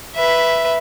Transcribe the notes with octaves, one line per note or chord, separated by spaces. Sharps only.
B4 E5